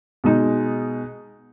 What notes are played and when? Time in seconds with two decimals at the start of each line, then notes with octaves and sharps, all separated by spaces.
0.24 B2 G#3 D#4